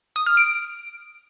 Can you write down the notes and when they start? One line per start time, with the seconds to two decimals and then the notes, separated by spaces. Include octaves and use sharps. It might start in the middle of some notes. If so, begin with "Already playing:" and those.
0.16 D#6
0.27 F6
0.37 D7